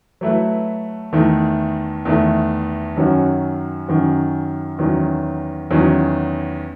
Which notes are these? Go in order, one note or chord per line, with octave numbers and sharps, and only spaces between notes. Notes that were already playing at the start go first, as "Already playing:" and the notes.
F#3 A3 E4 B4
E2 D#3 A3
E2 D#3 A3
F#2 D#3 F#3 C#4 F#4
F#2 D#3 F#3 C#4 F#4
E2 D#3 F#3 C#4
E2 D#3 F#3 C#4